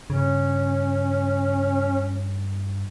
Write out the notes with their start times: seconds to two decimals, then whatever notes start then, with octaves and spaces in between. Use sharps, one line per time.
0.10 G2 C#3 C#4